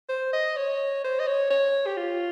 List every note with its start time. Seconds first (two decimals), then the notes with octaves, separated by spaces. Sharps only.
0.09 C5
0.33 D#5
0.57 C#5
1.04 C5
1.20 D#5
1.27 C#5
1.50 C#5
1.86 G4
1.97 F4